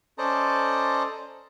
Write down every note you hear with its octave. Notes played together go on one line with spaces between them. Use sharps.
C#4 A4 C5 D5 D#5 A#5